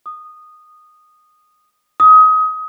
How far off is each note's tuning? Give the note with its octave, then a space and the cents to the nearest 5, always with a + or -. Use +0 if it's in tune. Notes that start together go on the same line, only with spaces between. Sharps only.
D#6 -15
D#6 +25